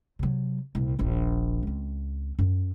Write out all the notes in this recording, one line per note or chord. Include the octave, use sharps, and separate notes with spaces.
C3 F#3
C2 A#2
D#1 A#1
C#2 C4
F#2